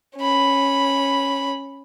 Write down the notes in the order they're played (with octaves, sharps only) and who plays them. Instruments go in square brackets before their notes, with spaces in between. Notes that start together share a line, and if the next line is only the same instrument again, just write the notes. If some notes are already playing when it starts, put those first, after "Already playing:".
[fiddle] C#4 B5